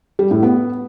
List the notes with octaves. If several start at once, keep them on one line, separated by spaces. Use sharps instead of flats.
G3
A2
B3